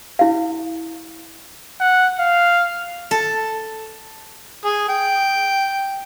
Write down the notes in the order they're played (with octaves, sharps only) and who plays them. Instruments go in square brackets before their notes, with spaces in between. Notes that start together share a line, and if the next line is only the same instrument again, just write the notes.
[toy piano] E4 F5
[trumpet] F#5
F5
[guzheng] A4
[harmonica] G#4
G5